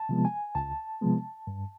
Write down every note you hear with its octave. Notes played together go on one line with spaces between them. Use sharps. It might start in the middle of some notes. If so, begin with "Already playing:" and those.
Already playing: A5
C3 F3 G#3 B3
G#5
C#2 A5
C3 F3 G#3 B3
G2